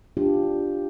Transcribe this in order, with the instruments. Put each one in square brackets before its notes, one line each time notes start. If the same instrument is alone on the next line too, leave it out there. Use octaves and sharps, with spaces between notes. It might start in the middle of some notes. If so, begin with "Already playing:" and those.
[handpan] D4 F4 G4